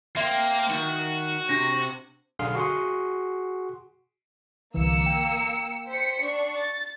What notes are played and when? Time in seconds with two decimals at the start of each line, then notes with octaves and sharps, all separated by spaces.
0.17 A#3 E5 G5 C6
0.70 D#3 F#4
1.49 C3 D4 A#6
2.39 B1 D3 G#4 F5 C6 F6
2.55 F#4 G#4 F#5 C6
4.74 C2 D3 E3 A#3 E6 C#7
5.06 G5
5.88 C5 B6 C#7
6.22 D4 C#6
6.57 A6